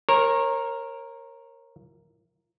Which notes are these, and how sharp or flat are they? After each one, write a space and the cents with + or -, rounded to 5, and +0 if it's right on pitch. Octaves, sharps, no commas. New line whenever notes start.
A#4 +0 C#5 -35